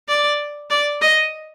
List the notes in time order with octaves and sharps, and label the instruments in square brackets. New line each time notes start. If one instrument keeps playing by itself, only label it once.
[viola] D5
D5
D#5